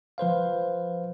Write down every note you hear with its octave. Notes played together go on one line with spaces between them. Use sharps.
F3 B4 C5 F5